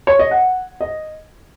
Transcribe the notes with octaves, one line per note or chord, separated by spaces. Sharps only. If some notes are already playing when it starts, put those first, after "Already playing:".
C#5
D#5
F#5
D#5